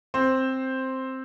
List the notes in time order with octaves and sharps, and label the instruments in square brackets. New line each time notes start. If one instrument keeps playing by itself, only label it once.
[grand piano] C4 C5